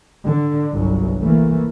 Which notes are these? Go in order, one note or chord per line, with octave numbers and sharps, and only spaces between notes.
D3
G1 C2 F#3
E3 A3 A#3